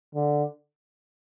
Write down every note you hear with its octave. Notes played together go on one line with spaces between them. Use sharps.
D3